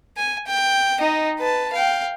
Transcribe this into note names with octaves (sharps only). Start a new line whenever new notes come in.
G#5
G5
D#4 D#5
B4 A5
F5 G5